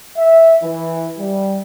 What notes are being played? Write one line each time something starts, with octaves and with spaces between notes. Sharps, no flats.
E5
E3
G3